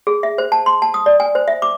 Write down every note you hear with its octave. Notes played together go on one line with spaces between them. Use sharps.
G#4
E5
C5
A5
C6
A5
D#6
D5
G#5
C5
E5
D6